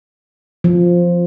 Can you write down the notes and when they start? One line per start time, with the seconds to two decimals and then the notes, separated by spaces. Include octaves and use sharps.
0.64 F3